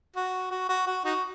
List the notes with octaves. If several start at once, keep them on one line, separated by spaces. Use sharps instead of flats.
F#4
F#4
F#4
F#4
D#4 F#4